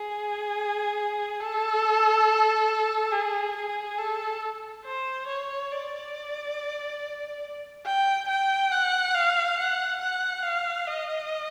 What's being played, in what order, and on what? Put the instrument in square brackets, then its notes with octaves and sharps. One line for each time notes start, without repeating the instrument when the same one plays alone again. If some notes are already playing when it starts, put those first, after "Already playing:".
Already playing: [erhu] G#4
A4
G#4
G#4
A4
C5
C#5
D5
G5
G5
F#5
F5
F#5
F#5
F5
D#5